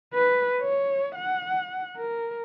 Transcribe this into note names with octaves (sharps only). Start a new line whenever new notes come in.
B4
C#5
F#5
A#4